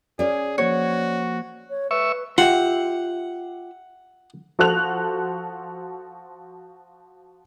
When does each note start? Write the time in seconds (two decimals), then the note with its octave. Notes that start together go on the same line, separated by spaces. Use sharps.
0.19 C#4 G#4 D5
0.58 F3 A#3 F#4 C5 C#5
1.70 C#5
1.91 B4 E5 C#6
2.38 F4 G4 E5 F#5
4.59 F3 F#4 A4 C5 F#6 F7